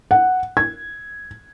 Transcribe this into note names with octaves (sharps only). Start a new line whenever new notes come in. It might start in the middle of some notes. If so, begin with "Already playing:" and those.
F#5
G#6